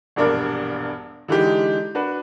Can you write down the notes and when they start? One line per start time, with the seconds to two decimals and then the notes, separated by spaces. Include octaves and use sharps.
0.16 E1 A#1 G2 D4 A#4 D6
1.28 D3 E3 G#3 D#4 G4
1.95 D4 F#4 B4